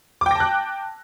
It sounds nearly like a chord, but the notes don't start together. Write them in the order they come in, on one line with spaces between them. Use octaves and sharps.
D6 G5 A#6 A5 F#6